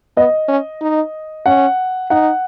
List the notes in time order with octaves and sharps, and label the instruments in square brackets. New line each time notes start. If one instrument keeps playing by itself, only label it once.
[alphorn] B3 [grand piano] D#5
[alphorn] C#4
D#4
[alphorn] C#4 [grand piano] F#5
[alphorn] D#4 [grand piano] F#5